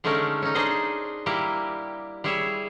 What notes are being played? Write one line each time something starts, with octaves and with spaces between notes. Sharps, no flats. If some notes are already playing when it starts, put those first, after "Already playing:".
D3 G#3 A3 C#4 D#4 A#4
C#4 D#4
D4 D#4 G#4 C5 D#5
G3 A#3 E4 G4
G3 E4 G#4 C#5 E5